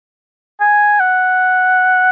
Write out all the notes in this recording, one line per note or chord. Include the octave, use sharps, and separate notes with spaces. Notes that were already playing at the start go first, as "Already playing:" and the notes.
G#5
F#5